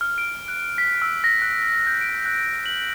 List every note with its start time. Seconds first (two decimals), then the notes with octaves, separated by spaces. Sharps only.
0.01 F6
0.18 D7
0.48 F#6
0.78 B6
1.02 E6
1.24 A#6
1.42 F#6
1.87 G6
2.01 D7
2.25 F#6
2.66 F#7